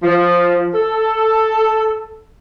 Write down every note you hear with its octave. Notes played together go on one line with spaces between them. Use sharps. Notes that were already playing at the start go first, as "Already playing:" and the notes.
F3
A4